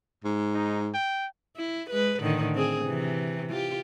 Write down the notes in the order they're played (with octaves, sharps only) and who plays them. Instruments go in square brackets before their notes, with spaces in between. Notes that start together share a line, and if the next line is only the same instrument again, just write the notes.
[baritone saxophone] G#2
[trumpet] D#4
G5
[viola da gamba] E4
G#3 B4
A2 D3 D#3
C4 G#4
C3 E3
F4 G4